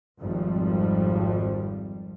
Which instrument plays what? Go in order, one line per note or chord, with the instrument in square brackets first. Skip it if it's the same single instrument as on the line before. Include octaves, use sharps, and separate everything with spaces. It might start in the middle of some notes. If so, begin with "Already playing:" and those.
[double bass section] G#1 F2 F3 G3